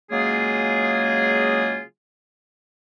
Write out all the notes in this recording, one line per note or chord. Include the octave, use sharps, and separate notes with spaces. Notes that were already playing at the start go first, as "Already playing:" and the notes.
C#3 F#3 G#3 A#3 F4 G#4